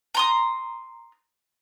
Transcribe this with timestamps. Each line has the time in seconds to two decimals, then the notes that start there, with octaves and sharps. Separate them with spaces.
0.15 A#5 C6 D#6